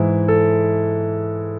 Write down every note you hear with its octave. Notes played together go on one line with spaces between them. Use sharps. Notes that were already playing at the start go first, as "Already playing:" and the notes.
Already playing: G#2 E3 E4
A4